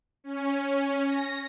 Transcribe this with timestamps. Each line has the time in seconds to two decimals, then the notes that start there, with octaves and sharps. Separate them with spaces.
0.24 C#4
1.07 A#6